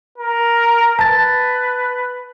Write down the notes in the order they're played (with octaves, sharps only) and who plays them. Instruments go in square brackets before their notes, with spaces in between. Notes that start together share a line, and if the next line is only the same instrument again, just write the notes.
[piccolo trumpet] A#4
[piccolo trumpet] B4 [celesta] A5 A6